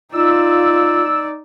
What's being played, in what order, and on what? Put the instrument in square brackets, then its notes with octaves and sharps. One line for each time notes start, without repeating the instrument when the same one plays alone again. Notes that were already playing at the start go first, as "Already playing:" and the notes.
[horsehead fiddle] D#4 D5 [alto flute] F4 [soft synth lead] E6